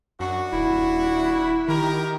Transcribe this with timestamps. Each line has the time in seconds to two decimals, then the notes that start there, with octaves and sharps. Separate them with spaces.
0.20 F#2 D4 F#4
0.53 D#1 E4
1.68 D#3 G4 A#4